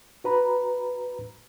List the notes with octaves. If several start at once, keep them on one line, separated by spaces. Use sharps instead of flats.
F#4 B4 A#5 B5